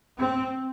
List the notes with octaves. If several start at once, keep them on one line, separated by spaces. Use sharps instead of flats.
C4